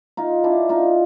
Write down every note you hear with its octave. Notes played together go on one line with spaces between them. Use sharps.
D#4 F4
D4 E4
D#4 F4